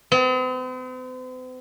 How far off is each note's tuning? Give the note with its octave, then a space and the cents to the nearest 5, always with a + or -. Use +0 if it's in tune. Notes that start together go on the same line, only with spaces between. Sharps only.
C4 -45